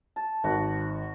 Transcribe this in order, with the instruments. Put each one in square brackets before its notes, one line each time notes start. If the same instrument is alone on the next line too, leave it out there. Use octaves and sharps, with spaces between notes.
[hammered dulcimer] A5
[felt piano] G#1 [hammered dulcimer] F#4